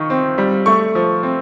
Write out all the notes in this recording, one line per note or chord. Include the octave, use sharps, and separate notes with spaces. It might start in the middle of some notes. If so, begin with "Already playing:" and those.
Already playing: D#3 F4 C#6
C4
G3
A3 C#6
F3
C4